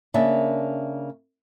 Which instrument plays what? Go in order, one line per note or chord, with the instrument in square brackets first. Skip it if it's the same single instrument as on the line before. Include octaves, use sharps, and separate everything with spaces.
[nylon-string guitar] C#3 A#3 D4 E5